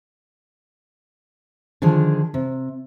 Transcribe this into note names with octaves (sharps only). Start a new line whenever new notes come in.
D3 D#3 F3 D4 G#4
C3